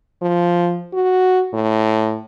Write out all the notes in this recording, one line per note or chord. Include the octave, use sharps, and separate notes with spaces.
F3
F#4
A2